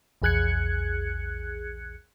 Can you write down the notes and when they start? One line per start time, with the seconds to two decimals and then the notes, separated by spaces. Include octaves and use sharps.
0.22 A#1 E2 G#4 F#6 G#6 C#7